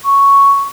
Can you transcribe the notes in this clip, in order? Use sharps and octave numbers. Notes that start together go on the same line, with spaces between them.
C#6